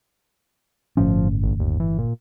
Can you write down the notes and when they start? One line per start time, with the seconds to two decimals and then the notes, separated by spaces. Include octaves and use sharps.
0.97 G1 A2 F3 C#4
1.43 A1
1.60 D#2
1.80 E3
1.98 A#2